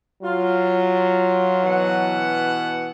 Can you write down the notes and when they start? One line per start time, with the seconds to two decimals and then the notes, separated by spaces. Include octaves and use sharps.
0.23 F#3 F4
1.64 B2 E3 F#5